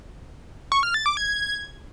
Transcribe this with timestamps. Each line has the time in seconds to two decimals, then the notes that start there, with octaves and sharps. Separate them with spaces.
0.72 C#6
0.83 F6
0.94 A6
1.06 D6
1.17 G#6